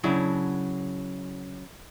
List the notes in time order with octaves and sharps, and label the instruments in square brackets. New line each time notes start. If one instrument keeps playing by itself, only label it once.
[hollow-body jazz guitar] C#3 F#3 D4 E4